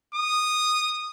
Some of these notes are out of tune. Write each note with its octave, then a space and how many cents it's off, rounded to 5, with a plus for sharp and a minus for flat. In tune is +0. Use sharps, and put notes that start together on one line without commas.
D#6 -10